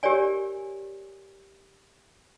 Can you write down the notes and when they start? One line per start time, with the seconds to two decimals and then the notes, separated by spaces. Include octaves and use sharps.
0.03 G4 A#4 C#5 D5 G#5